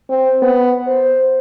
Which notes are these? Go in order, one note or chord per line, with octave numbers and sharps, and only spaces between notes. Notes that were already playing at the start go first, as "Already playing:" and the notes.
C4
B3
C5